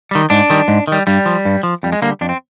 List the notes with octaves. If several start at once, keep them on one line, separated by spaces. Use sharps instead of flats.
D#3 G3
G#2 D4
D#3 G3
G#2
D#3 G3
G2 G3
F3
G2
F3
F2 G3
G#3
D3 G3 A#3
F2 D4
C4